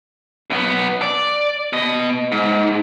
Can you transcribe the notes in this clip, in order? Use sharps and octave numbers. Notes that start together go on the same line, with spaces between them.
B1 B3
D5
B2 D#5
G#2